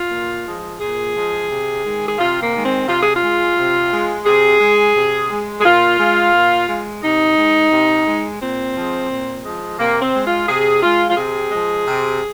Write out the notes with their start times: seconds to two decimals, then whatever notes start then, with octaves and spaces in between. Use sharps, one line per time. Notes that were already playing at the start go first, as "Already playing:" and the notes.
Already playing: F4
0.11 A#2
0.45 F3 G#3
0.80 A#2 G#4
1.15 F3 G#3
1.50 C3
1.84 D#3 G#3
2.07 G#4
2.19 C3 F4
2.41 A#3
2.53 D#3 G#3
2.64 C4
2.87 C3 F4
3.01 G#4
3.15 F4
3.22 G#3
3.57 C3
3.92 G#3
4.26 C3 G#4
4.60 G#3
4.94 C3
5.30 G#3
5.59 G#4
5.64 A#2 F4
5.99 G#3
6.33 A#2
6.68 G#3
7.03 C3 D#4
7.36 G#3
7.71 C3
8.06 G#3
8.40 A#2 C4
8.75 F3 G#3
9.10 A#2
9.44 F3 G#3
9.79 C3 A#3
10.01 C4
10.14 G#3
10.26 F4
10.48 C3 G#4
10.83 G#3 F4
11.09 F4
11.17 C3 G#4
11.51 F3 G#3
11.86 C3